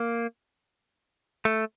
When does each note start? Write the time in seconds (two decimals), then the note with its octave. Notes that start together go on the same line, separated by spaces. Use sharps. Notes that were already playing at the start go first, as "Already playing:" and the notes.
Already playing: A#3
1.45 A3